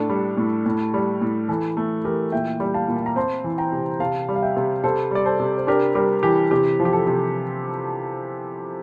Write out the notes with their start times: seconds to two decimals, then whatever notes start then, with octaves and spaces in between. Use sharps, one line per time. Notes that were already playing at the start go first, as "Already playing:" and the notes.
Already playing: A2 D4 A4
0.10 G3
0.37 A2
0.66 A2
0.94 G3
1.21 A2
1.48 E3 A4
1.77 A3 A4
2.05 E3 G4 A#4
2.32 A#2 E5 G5
2.60 G3
2.74 F5 A5
2.88 A#2
2.96 A5
3.06 A#5
3.16 C4 A5 C6
3.44 E3
3.58 G5 A#5
3.72 C3
4.00 C3 F5 A5
4.29 G3
4.36 F5
4.42 E5 G5
4.57 C3
4.83 C3 A4 C5
5.11 G3 D5
5.26 A4 C5
5.40 C3
5.57 C5
5.67 D4 G4 A#4
5.95 G3 G4 A#4
6.23 E3 G4
6.51 C3 G4
6.80 F3
6.85 G4
6.93 A4
7.07 C3